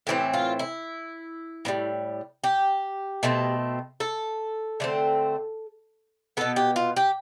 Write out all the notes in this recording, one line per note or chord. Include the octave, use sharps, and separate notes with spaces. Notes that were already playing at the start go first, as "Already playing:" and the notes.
A2 E3 A3 C4 G4
F4
E4
A2 E3 G3
G4
B2 A3 C4
A4
D3 A3 C4
B2 B3 A4
G4
F4
G4